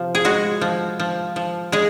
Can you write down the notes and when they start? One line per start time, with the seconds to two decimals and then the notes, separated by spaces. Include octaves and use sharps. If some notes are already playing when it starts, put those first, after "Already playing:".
Already playing: C3 F3
0.15 G#4
0.25 G#3 F#4
0.61 F3
1.00 F3
1.36 F3
1.72 G#3 G#4